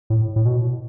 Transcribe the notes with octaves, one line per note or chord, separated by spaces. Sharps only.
A2
A2
B2